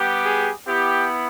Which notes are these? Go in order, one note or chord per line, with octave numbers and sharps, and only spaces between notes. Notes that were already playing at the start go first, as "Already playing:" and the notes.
Already playing: G3 B3 G4
G#4
B3 E4 G4